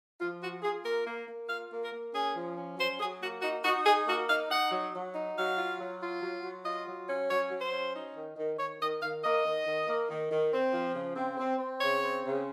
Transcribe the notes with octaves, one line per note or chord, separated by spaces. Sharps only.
F3 F4
F4 F#4
F4 G#4
A#3 A#4
A#3
A#3
F4 F5
A#3
A#4
A#3
C#4 G#4
F3
C#4
F#3 C5
F#3 G#4
A#3 F#4
D#4 F#4
D#4 F#4
D#4 G#4
A#3 F#4
D#4 F5
D#4 F#5
F#3
F#3
D#4
F#3 F5
F4
F#3
F4
F#3
F#3
F4 D#5
F#3
C#4
F#3 C#5
F#3
C5
C#4
D#4
D#3
D#3
D#3 C#5
D#3 D#5
D#3 F5
A#3 D#5
D#3
D#3
A#3
D#3
D#3
C4
F3
C#3
C4
C4
C4
C#3 C#5
C4
C#3